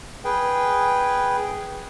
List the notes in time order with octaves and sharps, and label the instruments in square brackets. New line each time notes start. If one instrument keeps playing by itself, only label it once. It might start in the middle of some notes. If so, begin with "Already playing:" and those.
[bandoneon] G#4 B4 G5